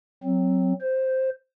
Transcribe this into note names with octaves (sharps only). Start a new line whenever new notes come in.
F#3 C4
C5